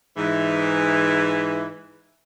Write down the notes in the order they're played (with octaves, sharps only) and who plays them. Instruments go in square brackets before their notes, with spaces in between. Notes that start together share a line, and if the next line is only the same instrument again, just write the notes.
[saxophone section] G#2 E3